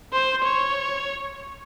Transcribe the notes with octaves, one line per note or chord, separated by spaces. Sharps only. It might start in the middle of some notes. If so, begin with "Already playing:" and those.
C5
C#5